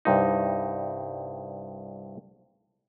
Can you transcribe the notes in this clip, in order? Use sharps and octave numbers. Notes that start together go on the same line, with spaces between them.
C2 G2 D#4